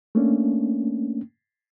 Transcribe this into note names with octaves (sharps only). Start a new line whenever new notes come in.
A3 A#3 C#4 D4